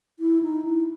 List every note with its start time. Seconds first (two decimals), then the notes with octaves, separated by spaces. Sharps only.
0.20 E4
0.42 D#4
0.65 E4